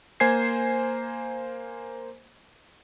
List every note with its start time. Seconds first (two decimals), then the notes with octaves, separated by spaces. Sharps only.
0.20 A#3 C5 G#5 G#6 C7